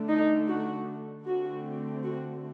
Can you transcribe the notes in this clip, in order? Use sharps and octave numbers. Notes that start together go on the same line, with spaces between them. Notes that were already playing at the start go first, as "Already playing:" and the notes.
Already playing: D3 A3 D4
D#4
F#4
D3 A3 C4 F#4
F#4